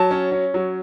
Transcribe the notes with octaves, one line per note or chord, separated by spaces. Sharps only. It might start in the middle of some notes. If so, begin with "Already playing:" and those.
Already playing: F#3 A5
C#4
C#4
F#3